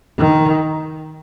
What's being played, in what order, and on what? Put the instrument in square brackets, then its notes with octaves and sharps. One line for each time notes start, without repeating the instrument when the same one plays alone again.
[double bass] D#3